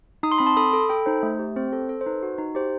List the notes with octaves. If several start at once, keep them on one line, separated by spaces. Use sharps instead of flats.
D#4 D#6
C6
C4 B5
A5 C6
A4 B5 D#6
A4
A4 G5 B5
D#4 C5
A3
G4
C4 C5
A4 C5
A4 C5
C5
D#4 B4
F#4
D#4
G4 C5